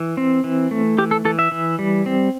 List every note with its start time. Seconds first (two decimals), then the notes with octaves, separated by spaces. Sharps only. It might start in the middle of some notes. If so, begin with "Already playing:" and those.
Already playing: E3
0.17 C4
0.44 E3
0.71 A3
0.98 E3 G4
1.11 A4
1.25 E3 A4
1.39 E5
1.52 E3
1.79 G3
2.06 C4